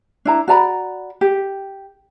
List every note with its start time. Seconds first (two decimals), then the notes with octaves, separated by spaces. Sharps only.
0.25 D4 E4 A#5
0.48 F#4 D5 A#5 B5
1.21 G4